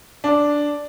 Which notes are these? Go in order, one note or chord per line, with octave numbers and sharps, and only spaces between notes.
D4